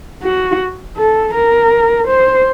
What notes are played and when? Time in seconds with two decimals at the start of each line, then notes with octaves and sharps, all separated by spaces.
0.23 F#4
0.97 A4
1.34 A#4
2.07 C5